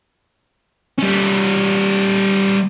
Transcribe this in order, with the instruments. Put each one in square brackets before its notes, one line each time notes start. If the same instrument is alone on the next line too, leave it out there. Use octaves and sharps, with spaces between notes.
[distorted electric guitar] G3 C#4